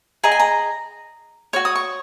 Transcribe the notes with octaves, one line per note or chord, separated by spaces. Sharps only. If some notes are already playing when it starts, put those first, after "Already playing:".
G#4 D#5 A#5
G#5
A#5
F#4 C#5 C#6
D#6
C#6